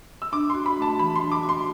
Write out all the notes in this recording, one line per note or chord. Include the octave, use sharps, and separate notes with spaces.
E6
D4 D6
F#4 C6
B5
A3
A5
E3 B5
C6
D4
D6
F#4
C6